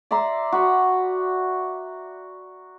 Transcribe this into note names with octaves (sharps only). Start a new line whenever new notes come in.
D5 E5 A#5 C6
F#4 B5